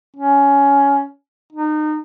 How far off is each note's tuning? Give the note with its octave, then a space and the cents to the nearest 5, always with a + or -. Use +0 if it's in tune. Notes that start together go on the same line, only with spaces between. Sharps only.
C#4 +15
D#4 -30